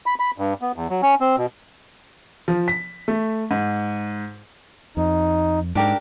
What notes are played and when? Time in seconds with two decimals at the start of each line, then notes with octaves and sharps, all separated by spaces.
0.06 B5
0.20 B5
0.38 G2
0.62 B3
0.76 E2
0.90 F#3
1.03 C#4
1.21 C4
1.38 B2
2.48 F3
2.68 B6
3.08 A3
3.51 G#2
4.97 F2 D#4
5.75 G#2 D4 G4 A#4